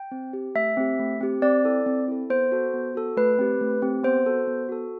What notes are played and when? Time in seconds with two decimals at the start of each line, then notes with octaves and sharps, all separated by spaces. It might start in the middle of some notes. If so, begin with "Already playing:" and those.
Already playing: G5
0.12 C4
0.33 G4
0.55 A3 E5
0.77 C4 G4
0.99 A3
1.20 C4 G4
1.42 C4 D5
1.64 E4 A4
1.86 C4
2.08 E4 A4
2.30 B3 C5
2.52 F#4 A4
2.74 B3
2.95 F#4 A4
3.17 A3 B4
3.39 C4 G4
3.61 A3
3.82 C4 G4
4.04 B3 C5
4.26 F#4 A4
4.47 B3
4.69 F#4 A4